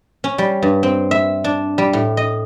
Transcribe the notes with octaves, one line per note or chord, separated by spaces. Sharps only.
C#4
G3
G2
C4
E5
D4
G3
A2
D#5